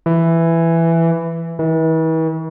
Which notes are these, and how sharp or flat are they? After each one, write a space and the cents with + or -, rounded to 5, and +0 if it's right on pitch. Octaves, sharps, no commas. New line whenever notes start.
E3 +10
E3 -40